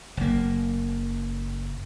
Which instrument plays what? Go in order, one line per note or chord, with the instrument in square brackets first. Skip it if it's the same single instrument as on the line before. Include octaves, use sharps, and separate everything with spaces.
[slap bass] F#1 A#3